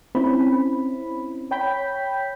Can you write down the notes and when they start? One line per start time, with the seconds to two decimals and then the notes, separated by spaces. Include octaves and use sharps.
0.15 C4 C#4 E4 B5
1.51 C#5 G5 B5 G6 B6